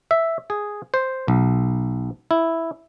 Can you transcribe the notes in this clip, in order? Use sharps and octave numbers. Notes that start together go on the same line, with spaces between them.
E5
G#4
C5
B1
E4